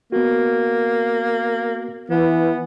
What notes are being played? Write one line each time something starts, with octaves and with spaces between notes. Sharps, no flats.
A#3 B3 F#4
E3 B3